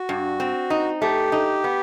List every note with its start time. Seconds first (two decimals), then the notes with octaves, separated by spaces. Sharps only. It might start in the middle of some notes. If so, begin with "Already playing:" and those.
Already playing: F#4
0.09 G2
0.40 C4
0.70 D#4
1.02 A3 G4
1.32 D#4
1.64 B3